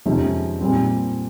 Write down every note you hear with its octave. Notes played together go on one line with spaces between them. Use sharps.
F2 C3 D#3 G#3 C#4
A#2 G3 C4